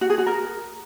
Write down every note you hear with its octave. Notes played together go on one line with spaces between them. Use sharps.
F#4
G#4
F#4
A#4